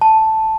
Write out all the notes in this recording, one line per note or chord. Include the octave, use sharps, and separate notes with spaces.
A5